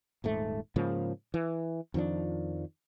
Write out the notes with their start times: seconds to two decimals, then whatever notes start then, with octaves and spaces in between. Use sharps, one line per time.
0.24 D#1 G#2 A3
0.76 G#2 C#3 F3 A#3
1.34 E3
1.94 F2 D#3 F3 D4